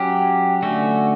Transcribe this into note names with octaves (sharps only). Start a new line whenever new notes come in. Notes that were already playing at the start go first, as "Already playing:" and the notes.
Already playing: F#3 C#4 G4
D3 A3 C#4 F#4